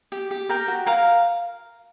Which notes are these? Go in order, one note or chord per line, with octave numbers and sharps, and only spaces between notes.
G4
G4
A#4 G5
F#4
A#4 F5